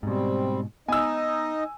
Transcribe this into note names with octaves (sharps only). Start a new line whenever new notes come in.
G#2 B2 G3 C4
B3 D#4 D#5 G#5 E6